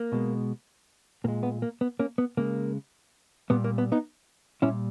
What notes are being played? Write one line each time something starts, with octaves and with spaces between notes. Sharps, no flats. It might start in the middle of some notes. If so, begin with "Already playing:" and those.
Already playing: A#3
B2 G#3
A#2 G#3 A#3
B3
A#3
B3
A#3 C#4
B3
C#3 G#3 A#3
A#2 G3 B3
A#3
B3
B3 D#4
A#2 G3 C#4 E4